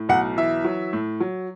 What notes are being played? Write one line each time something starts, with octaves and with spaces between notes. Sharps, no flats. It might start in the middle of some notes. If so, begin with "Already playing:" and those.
Already playing: A2
B1 F#5
E3 E5
F#3
A2
F#3